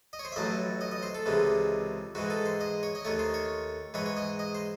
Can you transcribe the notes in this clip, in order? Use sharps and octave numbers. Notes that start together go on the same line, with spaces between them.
D#5
C#5
C5
E5
A1 A2 F#3 A3 D#5
D#5
D#5
C5
A4
C#2 C3 E3 G#3
G#2 E3 G#3 F#4
A4
C5
D#5
C#5
D#5
D#2 D#3 A3 C#5
C5
C#5
G#2 E3 G#3 C#5
C#5
D#5
D#5
C5